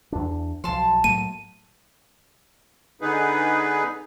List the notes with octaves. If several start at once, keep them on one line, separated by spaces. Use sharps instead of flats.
E2 D4
B1 F3 A5 C6
A2 F#3 A#3 D#7
D3 B3 D#4 G#4 B4